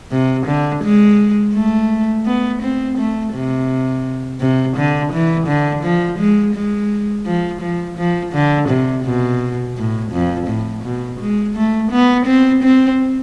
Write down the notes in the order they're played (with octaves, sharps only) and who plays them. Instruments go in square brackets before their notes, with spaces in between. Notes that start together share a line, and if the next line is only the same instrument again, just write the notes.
[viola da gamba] C3
D3
G#3
A3
B3
C4
A3
C3
C3
D3
E3
D3
F3
G#3
G#3
F3
F3
F3
D3
C3
B2
A2
F2
A2
B2
G#3
A3
B3
C4
C4